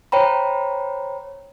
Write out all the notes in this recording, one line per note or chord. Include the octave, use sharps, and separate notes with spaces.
C5 C#5 G5 A#5 B5